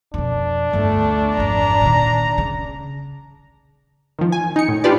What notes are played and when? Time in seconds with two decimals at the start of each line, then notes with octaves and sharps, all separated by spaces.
0.14 F2 B2 D4
0.73 G1 D2 A3
1.37 G#1 F2 A#5
1.81 A#2 D#3
2.38 C#3
4.19 D#3 F3
4.32 G#5
4.56 D#4 C#7
4.68 A2
4.84 D4 F4 G4 B4 D5